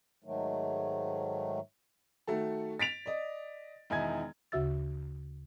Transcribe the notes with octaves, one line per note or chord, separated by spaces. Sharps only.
G#2 D#3 F#3 A3
D#3 A3 F#4 A4
A6 B6 D7 F7
D5 D#5
E1 D#3 D#4 E4 G#5 G#6
D2 C#3 F#4 E5 E6 A6